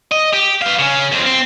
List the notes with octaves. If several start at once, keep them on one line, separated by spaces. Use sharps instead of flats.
D#5
G4
B4 F5
C#3 C#4
F2 C4
C4